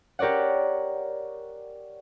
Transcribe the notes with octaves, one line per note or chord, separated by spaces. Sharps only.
G4 A#4 C#5 D5 F#5